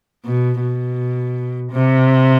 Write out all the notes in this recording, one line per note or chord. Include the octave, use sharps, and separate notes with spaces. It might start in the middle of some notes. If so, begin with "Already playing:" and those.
B2
B2
C3